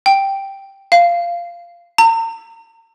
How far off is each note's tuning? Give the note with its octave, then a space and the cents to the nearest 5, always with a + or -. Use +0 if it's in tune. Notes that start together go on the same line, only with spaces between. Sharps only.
G5 +0
F5 -15
A#5 -40